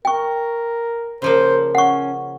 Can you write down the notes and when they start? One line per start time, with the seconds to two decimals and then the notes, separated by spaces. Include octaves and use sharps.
0.05 A#4 G5 C#6
1.22 C#3 F3 A#3 C5
1.75 C#4 F#5 C#6